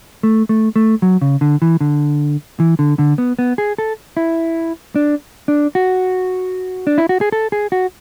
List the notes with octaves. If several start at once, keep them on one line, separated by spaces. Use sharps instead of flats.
A3
A3
A3
F#3
C#3
D3
E3
D3
E3
D3
D3
B3
B3
G#4
A4
E4
D4
D4
F#4
D4
E4
F#4
G#4
A4
G#4
F#4